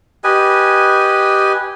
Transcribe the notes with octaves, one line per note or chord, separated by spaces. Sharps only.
G4 B4 D#5 G#5